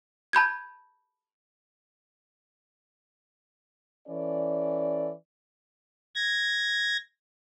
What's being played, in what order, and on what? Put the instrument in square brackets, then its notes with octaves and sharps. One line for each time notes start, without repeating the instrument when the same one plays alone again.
[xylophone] A5 B5 G6 G#6
[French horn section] E3 C#4 A4 D5
[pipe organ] G#6 A#6